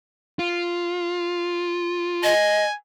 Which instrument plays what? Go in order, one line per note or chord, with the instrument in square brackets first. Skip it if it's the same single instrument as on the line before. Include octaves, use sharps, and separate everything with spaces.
[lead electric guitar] F4
[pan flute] D#5 [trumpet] G#5